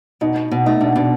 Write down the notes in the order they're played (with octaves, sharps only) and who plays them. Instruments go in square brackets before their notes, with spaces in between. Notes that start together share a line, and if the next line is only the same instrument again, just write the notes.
[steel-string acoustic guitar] B2 [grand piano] D#4
[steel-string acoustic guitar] B2
B2
[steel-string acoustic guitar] A3 [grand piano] D#4
[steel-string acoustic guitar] B2 [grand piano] D4
[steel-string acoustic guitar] B2 [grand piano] D4